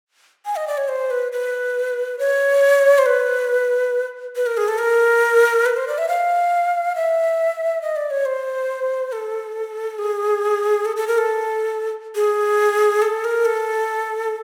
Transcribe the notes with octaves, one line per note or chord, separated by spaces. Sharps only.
G#5
D#5
D5
C#5
C5
B4
B4
C#5
C5
B4
B4
A#4
G#4
A4
A#4
B4
C5
D5
E5
F5
E5
D#5
D5
C#5
C5
A4
G#4
A4
A4
A#4
A4
G#4
A4
A#4
A4